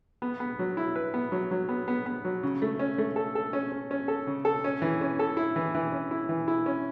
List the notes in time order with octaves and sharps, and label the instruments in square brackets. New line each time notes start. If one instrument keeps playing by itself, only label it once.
[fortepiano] B3
B3
F#3
E4
B4
B3
F#3
F#3
B3
B3
B3
F#3
C#3
A3
C#4
A3
A4
A4
C#4
C#4
C#4
A4
C#3
A4
C#4
E3
C#4
A4
E4
E3
E3
C#4
E4
E3
E4
C#4